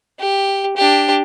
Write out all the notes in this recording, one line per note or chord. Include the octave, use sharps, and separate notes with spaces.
G4
D4 G4